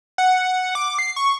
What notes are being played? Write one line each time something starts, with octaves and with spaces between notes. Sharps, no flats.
F#5
D6
C7
C#6